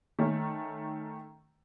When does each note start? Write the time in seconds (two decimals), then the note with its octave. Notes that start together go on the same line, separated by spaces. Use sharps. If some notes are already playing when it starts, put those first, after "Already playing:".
0.19 D#3 A3 C#4